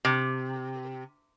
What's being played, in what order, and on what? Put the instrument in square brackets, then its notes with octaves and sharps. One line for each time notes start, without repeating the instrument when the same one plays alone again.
[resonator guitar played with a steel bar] C3